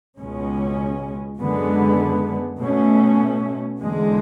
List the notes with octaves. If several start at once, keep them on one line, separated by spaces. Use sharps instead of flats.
C#2 B2 G#3 C#4
F#2 D3 G#3 B3
B2 A3 C#4
E2 D3 G#3